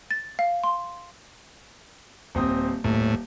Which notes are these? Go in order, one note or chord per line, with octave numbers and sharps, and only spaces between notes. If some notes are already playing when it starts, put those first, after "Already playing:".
A6
F5
C6
D#1 C4 D#6
D#1 A2